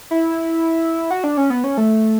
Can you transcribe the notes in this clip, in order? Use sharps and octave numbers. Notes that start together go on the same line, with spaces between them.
E4
F#4
D4
C#4
B3
C#4
A3